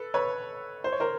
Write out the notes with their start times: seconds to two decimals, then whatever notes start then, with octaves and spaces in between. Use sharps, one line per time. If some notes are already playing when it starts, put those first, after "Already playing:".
Already playing: A4 B4
0.14 B4 C#5
0.84 C5
0.92 C#5
1.00 A#4 C5